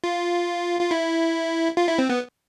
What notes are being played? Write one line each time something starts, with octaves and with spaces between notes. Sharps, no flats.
F4
F4
E4
F4
E4
C4
B3